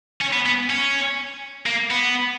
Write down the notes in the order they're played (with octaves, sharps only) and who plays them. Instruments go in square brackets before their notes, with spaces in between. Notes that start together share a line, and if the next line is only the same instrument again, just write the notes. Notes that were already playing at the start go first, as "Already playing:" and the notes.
[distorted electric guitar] C#4
B3
B3
C#4
A#3
B3